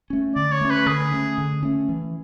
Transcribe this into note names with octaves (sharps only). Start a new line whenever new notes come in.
A3 C#4
D3 D5
C#5
A3 C#4
B4
D3 G#4
A3 C#4
D3
A3 C#4
E3